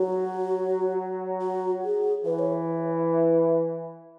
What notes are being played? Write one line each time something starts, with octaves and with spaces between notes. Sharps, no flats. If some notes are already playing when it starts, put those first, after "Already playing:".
Already playing: F#3 F#4
F#4
G#4
E3 B4
C#5